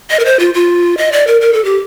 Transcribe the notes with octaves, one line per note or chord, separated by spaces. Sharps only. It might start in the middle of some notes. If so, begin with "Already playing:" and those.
D#5
A#4
C5
F4
F4
D#5
D5
A#4
A#4
A4
G4